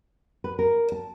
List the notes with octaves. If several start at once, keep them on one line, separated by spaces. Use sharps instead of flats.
B4
A#4
A5